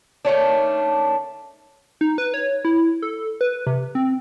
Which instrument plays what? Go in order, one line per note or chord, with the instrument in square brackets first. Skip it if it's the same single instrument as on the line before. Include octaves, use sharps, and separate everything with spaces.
[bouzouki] D#3 A3 C#4 D4
[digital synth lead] D#4
B4
C#5
E4
A4
B4
C3
C4